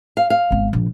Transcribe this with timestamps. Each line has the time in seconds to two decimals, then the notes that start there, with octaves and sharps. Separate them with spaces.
0.17 F5
0.30 F5
0.51 G#1 B3
0.73 A#1